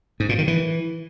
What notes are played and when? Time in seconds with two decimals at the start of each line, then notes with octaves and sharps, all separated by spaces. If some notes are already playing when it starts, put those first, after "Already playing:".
0.20 G#2
0.29 A#2
0.38 D#3
0.48 E3